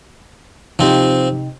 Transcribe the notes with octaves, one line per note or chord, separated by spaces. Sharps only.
C3 F3 C4 D#4 G4